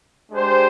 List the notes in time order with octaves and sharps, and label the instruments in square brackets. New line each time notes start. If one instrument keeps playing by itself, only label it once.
[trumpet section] G#3 D4 G4 C5